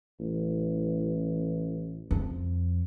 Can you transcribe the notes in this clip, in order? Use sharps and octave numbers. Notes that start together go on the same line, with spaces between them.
A1
F2